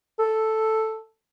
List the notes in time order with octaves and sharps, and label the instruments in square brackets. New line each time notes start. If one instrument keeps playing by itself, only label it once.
[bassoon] A4